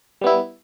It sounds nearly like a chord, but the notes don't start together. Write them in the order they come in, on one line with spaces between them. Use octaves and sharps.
G3 B3 E4